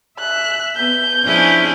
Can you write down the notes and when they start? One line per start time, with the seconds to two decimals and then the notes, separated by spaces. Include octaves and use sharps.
0.19 E5 F#6
0.76 B3 G6
1.24 F3 C#4 D4 E4 G#4